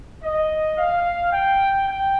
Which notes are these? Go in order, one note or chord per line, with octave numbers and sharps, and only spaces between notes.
D#5
F5
G5
G5